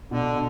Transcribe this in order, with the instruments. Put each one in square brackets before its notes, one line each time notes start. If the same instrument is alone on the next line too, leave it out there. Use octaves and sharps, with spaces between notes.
[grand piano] B2 [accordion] D3